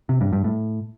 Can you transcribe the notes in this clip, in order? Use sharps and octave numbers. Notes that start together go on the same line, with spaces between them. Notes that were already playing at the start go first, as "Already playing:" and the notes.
C3
G2
G2
A2